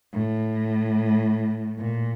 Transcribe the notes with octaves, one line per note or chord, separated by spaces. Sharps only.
A2
A#2